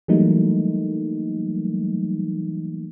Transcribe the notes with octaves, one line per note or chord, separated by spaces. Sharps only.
E3 F#3 G3 A3 A#3 D#4